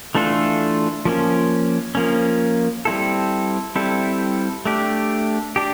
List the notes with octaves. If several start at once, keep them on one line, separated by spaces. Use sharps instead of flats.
E3 A3 D4 F4 A4
F3 A#3 C#4
F3 A#3 C#4
G3 C4 E4 A4
G3 C4 E4 A4
A3 D4 G4
D4 G4